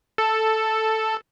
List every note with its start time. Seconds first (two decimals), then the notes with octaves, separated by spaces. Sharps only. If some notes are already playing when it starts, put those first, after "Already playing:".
0.18 A4